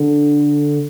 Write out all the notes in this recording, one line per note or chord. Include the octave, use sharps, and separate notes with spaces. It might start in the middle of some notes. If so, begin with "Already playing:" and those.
Already playing: D3